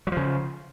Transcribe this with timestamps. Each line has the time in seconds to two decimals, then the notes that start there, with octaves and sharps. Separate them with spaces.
0.07 F#3
0.12 F3
0.17 C#3